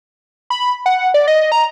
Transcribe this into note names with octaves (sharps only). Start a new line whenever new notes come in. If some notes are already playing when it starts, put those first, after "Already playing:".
B5
F#5
D5
D#5
A#5